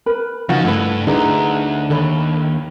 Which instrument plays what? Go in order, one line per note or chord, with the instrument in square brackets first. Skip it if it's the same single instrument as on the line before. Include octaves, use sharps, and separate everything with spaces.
[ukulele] A#4 B4 B5
[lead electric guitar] C#3 [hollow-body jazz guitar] F3 F4 F#4 [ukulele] D#4 F#5
[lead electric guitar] G2 [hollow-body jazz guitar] A3 B4 [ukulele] E4
[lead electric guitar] D2 [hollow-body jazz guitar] D3 D#4 E4 [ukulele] G#4 B4 A#5
[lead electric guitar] D#2 [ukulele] A4 C#5 B5